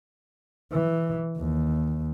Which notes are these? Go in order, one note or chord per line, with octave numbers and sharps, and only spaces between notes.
E3
D#2